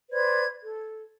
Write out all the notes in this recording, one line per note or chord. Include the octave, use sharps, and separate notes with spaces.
B4 C5 D5 G#6
A4